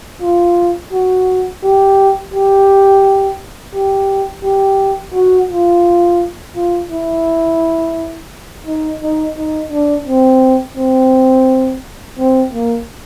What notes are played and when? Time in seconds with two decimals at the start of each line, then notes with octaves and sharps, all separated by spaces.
0.22 F4
0.92 F#4
1.64 G4
2.34 G4
3.74 G4
4.44 G4
5.14 F#4
5.50 F4
6.56 F4
6.91 E4
8.66 D#4
9.02 D#4
9.37 D#4
9.72 D4
10.07 C4
10.77 C4
12.18 C4
12.53 A#3